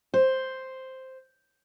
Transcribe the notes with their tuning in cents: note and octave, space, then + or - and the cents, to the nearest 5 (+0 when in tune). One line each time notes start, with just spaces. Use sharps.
C5 +0